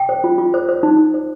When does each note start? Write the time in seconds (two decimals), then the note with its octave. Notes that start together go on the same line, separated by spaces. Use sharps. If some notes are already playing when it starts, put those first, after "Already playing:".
Already playing: G5
0.09 C5
0.24 F4
0.38 F4
0.54 C5
0.69 C5
0.83 D#4
0.98 D#4
1.14 C5